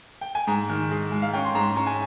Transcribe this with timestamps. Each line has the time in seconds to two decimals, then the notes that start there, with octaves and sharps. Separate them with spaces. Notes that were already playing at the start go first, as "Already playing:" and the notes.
0.21 G5
0.35 G#5
0.47 G#2 A#5
0.70 D#3
0.91 G#3
1.12 G#3
1.22 F5
1.34 C#4 G5
1.45 C6
1.55 G#2 A#5
1.76 C#4 A#5
1.87 G#5